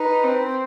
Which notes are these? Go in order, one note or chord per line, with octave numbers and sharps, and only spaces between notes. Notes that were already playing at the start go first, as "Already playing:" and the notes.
Already playing: D#4 B4
C4
C5